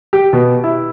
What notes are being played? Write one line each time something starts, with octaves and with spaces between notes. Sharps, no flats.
G4
B2
E4